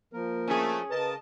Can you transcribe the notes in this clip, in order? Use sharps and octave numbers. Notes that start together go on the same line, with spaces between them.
F3 A#3 A#4
A3 C#4 G#4
C#3 A#4 B4 D#5 A5